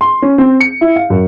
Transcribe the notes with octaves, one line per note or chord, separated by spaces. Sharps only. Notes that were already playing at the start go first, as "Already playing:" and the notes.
C6
C#4
C4
C#7
E4
F5
F#2